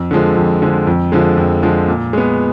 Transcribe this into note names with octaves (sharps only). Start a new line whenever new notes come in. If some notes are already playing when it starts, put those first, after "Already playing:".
Already playing: F2
D3 F3 G#3
F2
D3 F3 G#3
F2
D3 F3 G#3
F2
D3 F3 G#3
A#2
G#3 B3